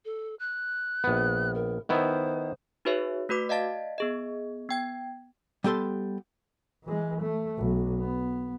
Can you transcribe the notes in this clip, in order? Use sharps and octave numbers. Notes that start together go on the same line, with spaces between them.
A4
F#6
A#1 B3
A#4
D#3 B3 E4 C5
D#4 F#4 G#4 B4 C#5 E5
A3 F#4 B4 D6 B6
D5 D#5 F5 A5 A6 B6
B3 G#4 D#5
B3 G5 G#6
G3 B3 G4 A4 C6
E3 G#3
A3
B1
B3